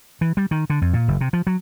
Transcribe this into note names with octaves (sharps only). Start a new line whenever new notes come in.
E3
G3
D#3
D3
F2
A#2
F#1
C3
F3
F#3